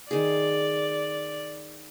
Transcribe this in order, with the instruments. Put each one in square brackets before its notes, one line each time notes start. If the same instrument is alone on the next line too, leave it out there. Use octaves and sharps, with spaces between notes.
[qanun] D#3 G#4 [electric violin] D5